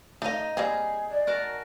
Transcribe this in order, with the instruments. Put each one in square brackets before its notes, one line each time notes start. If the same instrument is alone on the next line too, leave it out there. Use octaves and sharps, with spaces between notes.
[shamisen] A3 F5 [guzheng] D#4 D#5
[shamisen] G3 A#3 C4 [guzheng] G#4
[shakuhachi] D5
[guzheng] F#4 A#4 A5